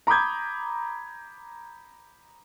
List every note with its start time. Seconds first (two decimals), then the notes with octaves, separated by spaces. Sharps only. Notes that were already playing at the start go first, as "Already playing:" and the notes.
0.07 A#5 B5 D6 D#6 G6 G#6